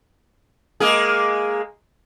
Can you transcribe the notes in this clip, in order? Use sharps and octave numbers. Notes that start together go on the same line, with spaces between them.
G#3 A#3 G#4